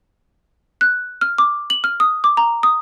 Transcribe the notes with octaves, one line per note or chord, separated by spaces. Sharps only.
F#6
F6
D6
F#7
F6
D#6
D6
A#5
D#6